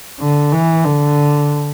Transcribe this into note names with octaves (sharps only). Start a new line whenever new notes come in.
D3
E3
D3